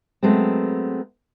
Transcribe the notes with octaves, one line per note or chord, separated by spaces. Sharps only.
F#3 G#3 A3 B3 C4